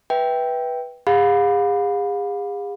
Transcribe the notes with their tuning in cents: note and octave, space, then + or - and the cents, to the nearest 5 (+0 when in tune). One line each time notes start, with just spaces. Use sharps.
B4 -10 E5 -5 G5 +0
G#4 -40 F5 +40 B5 +0